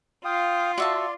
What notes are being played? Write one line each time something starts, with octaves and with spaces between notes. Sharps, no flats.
F4 F5 G5 D#6
F#4 D5 E5 A5 C6